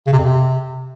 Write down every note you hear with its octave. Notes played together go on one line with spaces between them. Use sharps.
C#3
C3
F2
C3